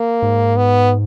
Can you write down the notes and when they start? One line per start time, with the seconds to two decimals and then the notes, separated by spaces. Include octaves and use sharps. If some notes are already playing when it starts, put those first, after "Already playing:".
Already playing: A#3
0.22 G#2
0.57 B3